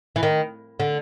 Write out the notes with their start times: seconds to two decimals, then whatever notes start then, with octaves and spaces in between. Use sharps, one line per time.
0.16 E3
0.23 D#3
0.80 D3